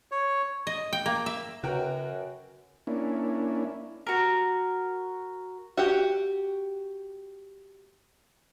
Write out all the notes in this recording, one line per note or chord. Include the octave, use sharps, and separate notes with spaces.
C#5
D#5
G5
A#3
E5
F#2 C#3 F#4 A#4 B4 G5
A#3 C#4 D4 E4
F#4 A#4
F#4 G4